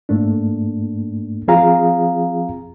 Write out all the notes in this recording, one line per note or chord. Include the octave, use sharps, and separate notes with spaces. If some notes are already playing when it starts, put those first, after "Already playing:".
G#2 A3 A#3 D4
F3 C4 F4 G#4 F5 A#5